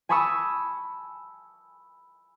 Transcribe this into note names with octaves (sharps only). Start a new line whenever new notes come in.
G#5 A5 B5 C#6 D#6 E6